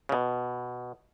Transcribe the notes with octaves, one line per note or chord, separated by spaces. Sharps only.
C#3
B2